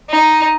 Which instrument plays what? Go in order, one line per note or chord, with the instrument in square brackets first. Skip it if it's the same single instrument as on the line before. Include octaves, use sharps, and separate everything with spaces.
[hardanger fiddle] D#4